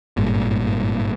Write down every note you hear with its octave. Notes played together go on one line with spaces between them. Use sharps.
G#1 G2 A#2